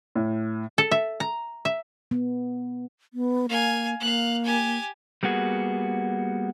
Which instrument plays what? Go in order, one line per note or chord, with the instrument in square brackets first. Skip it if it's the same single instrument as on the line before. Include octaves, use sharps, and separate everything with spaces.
[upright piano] A2
[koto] A4
E5
A#5
E5
[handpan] B3
[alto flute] B3
[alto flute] A#3 [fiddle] F5 G#5
[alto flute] A#3 [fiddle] F5 F#6
[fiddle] G4 G#5
[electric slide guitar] G3 A#3 B3 F#4 G#4